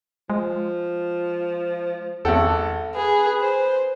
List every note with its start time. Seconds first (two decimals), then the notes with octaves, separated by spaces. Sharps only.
0.30 F3 G#3
2.25 G#1 E2 A4 F#5 G5
2.95 G#4 B4
3.41 C5